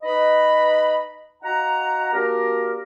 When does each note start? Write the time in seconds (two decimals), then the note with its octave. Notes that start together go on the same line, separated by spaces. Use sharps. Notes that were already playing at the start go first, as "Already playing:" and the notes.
0.03 D#4 B4 D#5 B5
1.43 D#4 F#4 F5 F#5 A#5
2.12 A#3 D4 F#4 G4 A#4